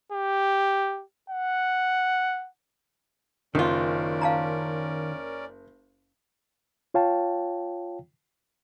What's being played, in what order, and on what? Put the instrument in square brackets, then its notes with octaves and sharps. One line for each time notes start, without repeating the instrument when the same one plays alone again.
[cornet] G4
F#5
[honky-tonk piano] F#1 [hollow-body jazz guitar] D#3 F4 [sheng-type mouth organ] C#4 A#4 D5
[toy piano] F5 A5 A#5
[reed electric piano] F4 C#5 F5 G5 A5